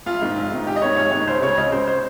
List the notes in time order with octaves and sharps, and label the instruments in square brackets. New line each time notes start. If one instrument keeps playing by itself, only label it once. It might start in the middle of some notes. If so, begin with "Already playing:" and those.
[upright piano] A#1 F4
G#2 D#3
A#1
G#2 D#3
A#1 G4
D#5
G#2 D#3 C#5
A#1 C#5
G#2 D#3 C#5
C#2 C5
C#3 C#5
C#2 D#5
C#3 C5
C5